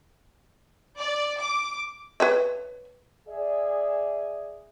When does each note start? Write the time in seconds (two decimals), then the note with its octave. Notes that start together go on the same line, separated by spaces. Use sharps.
0.98 D5
1.39 D6
2.20 B4 C#5 E5
3.28 G#4 D5 E5